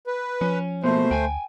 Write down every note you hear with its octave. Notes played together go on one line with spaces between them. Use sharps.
B4
F3 C#4
B2 A3 A#3 C5
D2 G5 G#5